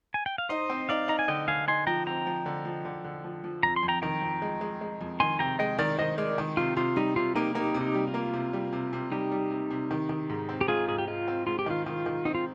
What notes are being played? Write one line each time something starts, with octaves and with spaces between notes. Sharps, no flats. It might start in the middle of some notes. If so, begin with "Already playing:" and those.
G#5
G5
F5
D#4 C5 D#5
C4
D#4 D5 F5
D#4 A#5
G#5
D3 D#5 G5
D3 F5 G#5
D#4 G#5 C6
F3 G5 A#5
C4 G5 A#5
F3
D3
F3
D3
D3
F3
F3
F2 A#5
C6
F2
G5 A#5
D#3 G5 A#5
F2
G#3
G#3
G#3
F2
D#3 G#5 C6
C3 G5 A#5
G#3 D#5 G5
D#3 A#4 D5
D#3 C5 D#5
G#3 A#4 D5
D#3
C3 F4
C3 F4
G3 D#4
C3 F4
A#3 D#4 G4
A#3 D#4 G4
C3
D#4 G4
G3
F4
A#3
C3
G3
C3
C3
G3 D#4 G4
G3
C3
C3
D#3
D#3
G#2
C4
G4
G#2 F4 G#4
G#2 G#4
G4
G#3 F4
C4
G#2 F4
G4
D#3 F4
D#3 F4
D#3
C4 D#4
F4